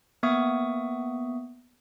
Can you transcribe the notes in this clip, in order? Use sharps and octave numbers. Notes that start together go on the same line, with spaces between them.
A#3 B3 E5 C#6 D#6